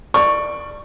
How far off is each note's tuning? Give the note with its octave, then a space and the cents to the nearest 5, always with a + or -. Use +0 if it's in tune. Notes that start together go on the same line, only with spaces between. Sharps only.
D5 +15 C#6 +0